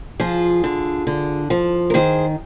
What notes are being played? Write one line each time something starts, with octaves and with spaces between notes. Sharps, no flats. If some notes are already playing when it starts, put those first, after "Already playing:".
F3 F4 G#4
D3
D3
F3
A#4
D#3 G#4 C5